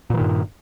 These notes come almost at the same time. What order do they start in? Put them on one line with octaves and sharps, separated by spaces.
A#2 E3 D#3 G2